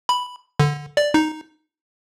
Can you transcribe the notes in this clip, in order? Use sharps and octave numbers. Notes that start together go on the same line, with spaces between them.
B5
D3
D5
D#4